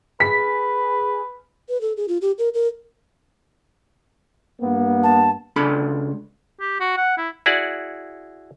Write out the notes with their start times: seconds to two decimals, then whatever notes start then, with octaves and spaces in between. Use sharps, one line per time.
0.20 G#4 B4 B6
1.69 B4
1.81 A4
1.97 G#4
2.08 F4
2.22 G4
2.38 A#4
2.54 A#4
4.61 G2 A#3 B3
5.03 A5
5.56 C#2 D4 A4 B5
6.61 G4
6.80 F#4
6.97 F#5
7.17 E4
7.46 E4 F#4 G#4 D5 F#5